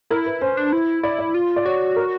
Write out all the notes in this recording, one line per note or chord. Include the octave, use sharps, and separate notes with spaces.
E4 A#4
B4
C#4 C5
D4
E4
E4 D5
D5
F4
D5
F#4 C#5
A#4